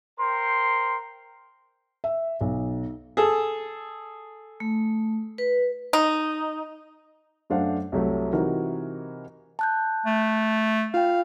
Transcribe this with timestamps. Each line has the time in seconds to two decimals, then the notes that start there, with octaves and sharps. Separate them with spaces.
0.19 A#4 C5 G5 C6
2.04 E5
2.41 B1
3.17 G#4 A4
4.60 A3
5.38 B4
5.93 D#4
7.50 F#2 A3 D4 C5 F5 F#5
7.92 C2 F#3 A3
8.33 C3 E3 D#4 F#4 A#4
9.59 A5 F#6 G6
10.06 A3
10.94 F4 F5 G5